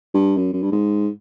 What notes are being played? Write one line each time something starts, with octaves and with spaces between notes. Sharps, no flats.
G2
F#2
F#2
G2
G#2